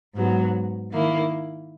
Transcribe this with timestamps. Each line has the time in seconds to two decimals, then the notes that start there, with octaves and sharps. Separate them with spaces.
0.16 G#2 F#3 B3
0.91 D#3 A#3 E4